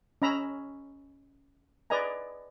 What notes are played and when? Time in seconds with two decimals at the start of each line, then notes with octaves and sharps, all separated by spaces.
0.22 C#4 D#5 A#5 B5 E6
1.90 B4 D5 D#5 G#5 A#5